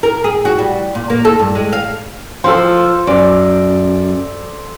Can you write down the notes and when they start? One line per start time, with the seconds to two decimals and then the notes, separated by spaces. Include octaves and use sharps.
0.03 A#4
0.24 G#4
0.45 F#4
0.59 G3
0.95 A#2
1.10 A#3
1.25 A4
1.39 G2
1.55 G#3
1.73 F5
2.44 F3 A4 C5
3.07 F#2 D5